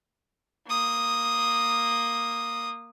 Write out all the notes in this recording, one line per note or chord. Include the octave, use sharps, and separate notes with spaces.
A#3 D#6